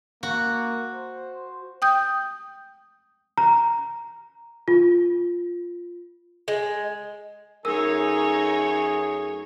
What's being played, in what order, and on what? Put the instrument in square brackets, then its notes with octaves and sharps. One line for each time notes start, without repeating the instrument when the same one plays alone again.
[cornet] A#3 [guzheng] F#4
[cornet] C5
[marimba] G5 D#6 G6
[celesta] A#5
F4
[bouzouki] G#3
[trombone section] F#2 A3 G#4 [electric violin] D#4 C#5 [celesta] A#4 E6